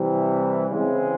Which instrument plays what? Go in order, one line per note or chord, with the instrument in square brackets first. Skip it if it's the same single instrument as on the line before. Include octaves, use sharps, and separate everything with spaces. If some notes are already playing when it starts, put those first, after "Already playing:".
Already playing: [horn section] C3 E3 G3
C#3 E3 G#3 C4